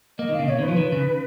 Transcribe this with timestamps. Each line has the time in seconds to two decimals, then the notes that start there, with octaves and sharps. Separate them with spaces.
0.19 A#3 D#5
0.29 D#3 F5
0.39 C#3
0.48 B2 C#5
0.59 D#3
0.63 B4
0.68 F3
0.77 D#3
0.92 C#3